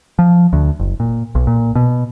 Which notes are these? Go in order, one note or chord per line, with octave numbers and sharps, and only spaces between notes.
F3
D2
F#1
A#2
B1
A#2
B2